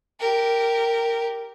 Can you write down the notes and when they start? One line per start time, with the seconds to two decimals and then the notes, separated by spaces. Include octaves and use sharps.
0.20 G4 A#4